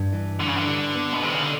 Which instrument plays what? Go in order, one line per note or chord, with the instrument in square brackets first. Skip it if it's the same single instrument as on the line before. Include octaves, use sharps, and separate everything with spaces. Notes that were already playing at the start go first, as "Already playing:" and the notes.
Already playing: [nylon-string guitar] G2
E3
[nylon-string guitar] G2 [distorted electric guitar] D3
[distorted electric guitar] C#3
D3
[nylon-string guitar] G3
B3
[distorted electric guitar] B2
[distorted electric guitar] C3 [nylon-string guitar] D#3
[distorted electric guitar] C#3
D3